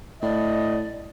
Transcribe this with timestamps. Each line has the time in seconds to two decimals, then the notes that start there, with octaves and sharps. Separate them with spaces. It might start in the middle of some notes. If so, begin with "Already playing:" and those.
0.22 A2 D5 D#5